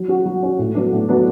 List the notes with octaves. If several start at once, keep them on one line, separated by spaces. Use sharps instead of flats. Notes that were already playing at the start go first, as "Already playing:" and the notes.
Already playing: F#3
C#4 F#4
F#3
C#4 F#4
A2
F#3 B3 D4
A2
F#3 B3 D4